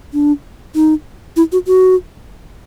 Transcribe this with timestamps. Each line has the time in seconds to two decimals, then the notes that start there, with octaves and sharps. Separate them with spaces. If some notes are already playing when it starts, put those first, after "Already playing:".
0.13 D4
0.75 D#4
1.37 E4
1.52 F#4
1.67 F#4